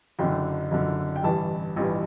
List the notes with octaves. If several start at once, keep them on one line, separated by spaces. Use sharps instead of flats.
F#1 F#2 D3 G5
F#1 F#2 D3
G5
A1 G2 E3 A5
A1 G2 E3